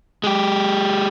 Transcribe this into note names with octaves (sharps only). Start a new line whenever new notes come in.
G#3 G4